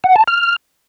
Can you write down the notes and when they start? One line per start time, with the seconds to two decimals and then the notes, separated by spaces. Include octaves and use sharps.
0.04 F#5
0.16 A5
0.28 F6